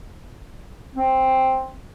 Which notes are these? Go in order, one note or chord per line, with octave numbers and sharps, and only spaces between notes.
C4